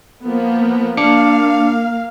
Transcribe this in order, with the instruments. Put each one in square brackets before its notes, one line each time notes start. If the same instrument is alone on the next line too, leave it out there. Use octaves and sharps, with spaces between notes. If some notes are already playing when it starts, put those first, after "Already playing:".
[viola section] F3 A#3 B3
[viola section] A#3 F5 [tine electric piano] D4 D6 C#7